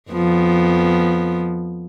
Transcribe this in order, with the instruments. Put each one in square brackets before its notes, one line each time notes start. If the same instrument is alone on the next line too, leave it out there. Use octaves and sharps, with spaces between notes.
[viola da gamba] F2 F3 B3